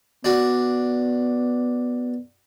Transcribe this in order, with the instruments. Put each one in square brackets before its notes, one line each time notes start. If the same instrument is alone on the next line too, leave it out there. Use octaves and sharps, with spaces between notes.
[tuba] B3 [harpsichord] D4 F#4